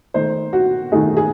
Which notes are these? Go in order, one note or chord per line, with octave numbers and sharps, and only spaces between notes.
D#3 A3 D#4 C5
F#4
D#3 A3 D#4 G#4
G#4